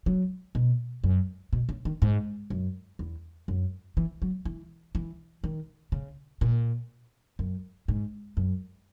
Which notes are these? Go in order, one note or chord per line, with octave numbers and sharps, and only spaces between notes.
F#3
B2
F#2
B2
C#3
D#3
G#2
F#2
E2
F#2
E3
F#3
E3
E3
D#3
C#3
A#2
F#2
G#2
F#2